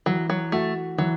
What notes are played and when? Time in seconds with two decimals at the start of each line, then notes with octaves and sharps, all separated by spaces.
0.06 E3 F#3
0.30 F#3
0.52 A3 F#4
0.98 E3 F#3